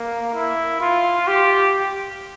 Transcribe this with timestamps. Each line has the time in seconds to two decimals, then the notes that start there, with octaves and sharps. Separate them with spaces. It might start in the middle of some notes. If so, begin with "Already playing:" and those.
Already playing: A#3
0.34 E4
0.80 F4
1.27 G4